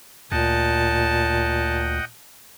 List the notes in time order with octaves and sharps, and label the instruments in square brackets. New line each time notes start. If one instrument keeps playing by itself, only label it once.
[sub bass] D2 [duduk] A#2 [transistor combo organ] D#5 F#5 G5 [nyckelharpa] A5